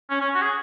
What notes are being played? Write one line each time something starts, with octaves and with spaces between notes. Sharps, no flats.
C#4
C#4
F#4
G#4